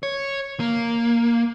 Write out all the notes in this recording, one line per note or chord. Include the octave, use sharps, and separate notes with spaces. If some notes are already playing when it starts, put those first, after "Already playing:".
C#5
A#3